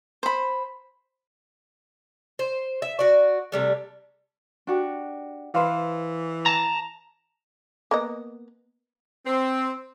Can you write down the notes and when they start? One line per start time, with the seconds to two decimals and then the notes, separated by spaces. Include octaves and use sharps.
0.23 C5 B5
2.39 C5
2.82 E5
2.99 F#4 D5
3.52 C3 G3 A3
4.67 D4 F#4 G4
5.54 E3 B4 C5 F5
6.46 A5 A#5
7.91 A#3 B3 D#5
9.26 C4